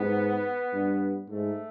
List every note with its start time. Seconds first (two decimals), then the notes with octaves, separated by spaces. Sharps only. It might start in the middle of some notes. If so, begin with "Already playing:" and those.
Already playing: G#2 B3
0.74 G2
1.30 G#2 A3